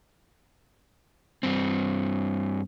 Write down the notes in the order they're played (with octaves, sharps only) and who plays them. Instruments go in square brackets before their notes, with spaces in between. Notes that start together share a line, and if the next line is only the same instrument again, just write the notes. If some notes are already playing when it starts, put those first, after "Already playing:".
[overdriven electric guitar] G2 C4